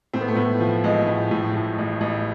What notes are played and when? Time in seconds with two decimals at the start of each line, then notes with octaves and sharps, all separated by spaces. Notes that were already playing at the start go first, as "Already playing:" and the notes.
0.13 A2 C4
0.21 B3
0.28 A3
0.35 A2 B3
0.60 F3
0.84 A1 G#3
1.07 A2
1.31 A2
1.54 A2
1.78 A1
2.01 A1